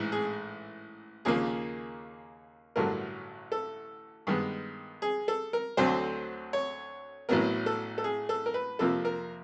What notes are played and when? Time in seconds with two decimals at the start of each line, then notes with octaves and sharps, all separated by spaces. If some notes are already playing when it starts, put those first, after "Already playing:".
Already playing: A1 G#2 E3
0.12 G#4
1.25 D#2 C#3 F3 A#3 G#4
2.76 A1 G2 D3 F#3 A3 A#4
3.52 A4
4.27 G2 D#3 G#3 B3
5.02 G#4
5.28 A4
5.53 A#4
5.77 D2 D3 F#3 A3 C4 C5
6.53 C#5
7.29 A1 A2 F#3 B3 A#4
7.66 A4
7.98 A4
8.04 G#4
8.29 A4
8.46 A#4
8.54 B4
8.79 F2 C3 F3 A#3 A4
9.05 A#4